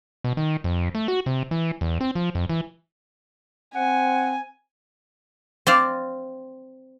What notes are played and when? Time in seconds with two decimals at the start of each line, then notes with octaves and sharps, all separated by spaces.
0.24 B2
0.37 D#3
0.64 F2
0.95 A3
1.08 F#4
1.26 C3
1.51 E3
1.81 E2
2.01 C4
2.15 F3
2.35 F2
2.49 E3
3.75 C4 F#5 G#5
5.67 C4 D5 F5